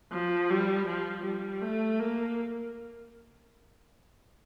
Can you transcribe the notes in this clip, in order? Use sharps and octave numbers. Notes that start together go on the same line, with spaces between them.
F3
G3
F3
G3
A3
A#3